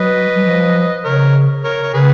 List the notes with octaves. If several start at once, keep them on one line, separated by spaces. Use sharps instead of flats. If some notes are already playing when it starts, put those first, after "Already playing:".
Already playing: F#3 B4 D#5
F#3
F3
C#3 A#4 C#5
A#4 C#5
C#5
C#3 G#4 B4